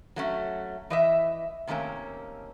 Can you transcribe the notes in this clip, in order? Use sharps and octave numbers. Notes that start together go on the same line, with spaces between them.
F#3 A3 C#4
E3 D#5 E5
C3 D#3 A3 A#3 C#4